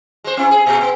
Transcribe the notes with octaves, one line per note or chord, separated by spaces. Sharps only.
G#3 C5
C4 E4
G#4
A#2
B3